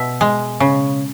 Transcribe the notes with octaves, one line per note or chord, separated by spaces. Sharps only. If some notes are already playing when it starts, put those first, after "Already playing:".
Already playing: B2 E5
G#3
C#3